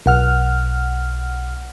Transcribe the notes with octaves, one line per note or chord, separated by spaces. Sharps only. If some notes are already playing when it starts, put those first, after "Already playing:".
B1 F#5 F6